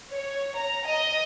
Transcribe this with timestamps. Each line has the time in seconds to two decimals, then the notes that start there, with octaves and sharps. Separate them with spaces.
0.10 C#5
0.56 A#5
0.86 D#5